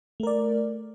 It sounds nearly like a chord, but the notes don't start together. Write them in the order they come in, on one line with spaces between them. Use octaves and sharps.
A3 A#4 D5